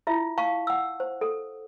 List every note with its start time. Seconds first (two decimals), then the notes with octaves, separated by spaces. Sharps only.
0.07 E4 F4 E5
0.38 F5 A5 C#6
0.67 F#5 E6
1.00 C5
1.21 A4